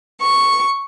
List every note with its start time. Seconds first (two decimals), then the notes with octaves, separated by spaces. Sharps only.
0.22 C#6